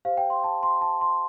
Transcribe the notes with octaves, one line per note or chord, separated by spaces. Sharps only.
G4 C5 F5
G5
C6
A5
C6
A5
C6